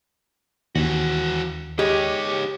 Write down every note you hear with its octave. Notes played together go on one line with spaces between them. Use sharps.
D#2 E3 F#4
G#3 D#4 G4 C#5